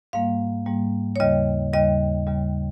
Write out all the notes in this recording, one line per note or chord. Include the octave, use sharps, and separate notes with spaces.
G#2 G3 A#3 F5
G#2 G3 A#3
C#5
D#2 C#3 G3 D#5
D#2 C#3 G3 D#5
D#2 C#3 G3